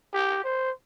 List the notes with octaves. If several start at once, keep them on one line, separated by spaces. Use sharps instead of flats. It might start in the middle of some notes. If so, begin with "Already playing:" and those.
G4
C5